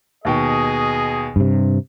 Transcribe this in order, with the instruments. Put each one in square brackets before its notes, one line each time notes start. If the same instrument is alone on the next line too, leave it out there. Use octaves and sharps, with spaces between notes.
[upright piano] D#2 B2 G5 [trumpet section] G#4 D#5
[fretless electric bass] G2 C3